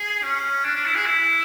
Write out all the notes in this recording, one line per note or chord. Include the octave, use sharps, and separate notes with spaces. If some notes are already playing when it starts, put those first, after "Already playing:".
Already playing: G#4
C#4
D4
D4
E4
G#4
E4